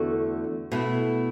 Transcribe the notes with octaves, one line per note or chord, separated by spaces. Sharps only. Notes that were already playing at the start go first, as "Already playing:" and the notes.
Already playing: E2 D3 A3 F#4
B2 A3 E4